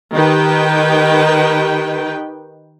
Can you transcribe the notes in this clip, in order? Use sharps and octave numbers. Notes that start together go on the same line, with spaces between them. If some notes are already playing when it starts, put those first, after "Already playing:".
D#3 G4 B4 G5